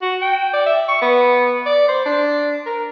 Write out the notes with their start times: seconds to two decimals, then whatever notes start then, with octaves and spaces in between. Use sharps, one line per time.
0.02 F#4
0.21 G5
0.53 D5
0.66 E5
0.88 C#6
1.02 B3
1.66 D5
1.88 C5
2.05 D4
2.66 A#4